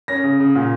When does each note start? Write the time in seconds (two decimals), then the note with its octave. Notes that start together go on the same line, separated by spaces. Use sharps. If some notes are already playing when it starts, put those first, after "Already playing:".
0.08 C#4 A#6
0.24 C#3
0.40 C#3
0.55 A#2